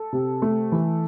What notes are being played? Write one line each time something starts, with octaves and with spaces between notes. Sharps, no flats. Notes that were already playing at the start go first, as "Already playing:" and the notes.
Already playing: A4
C3
A3
E3